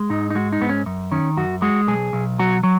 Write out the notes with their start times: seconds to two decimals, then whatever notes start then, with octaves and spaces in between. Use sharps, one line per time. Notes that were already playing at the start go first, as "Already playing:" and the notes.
Already playing: G#3
0.10 G#2 D#4
0.30 D#4
0.35 G#3 F#4
0.52 D#4
0.61 G#2 B3
0.69 C#4
0.86 F#2
1.11 D#3 C#4
1.37 F#2 F#4
1.62 G#3 F#4
1.87 B1 G#4
2.13 B1
2.39 F#3 F#4
2.63 F#3